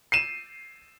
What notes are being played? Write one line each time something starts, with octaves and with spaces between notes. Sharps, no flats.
C7 D#7 E7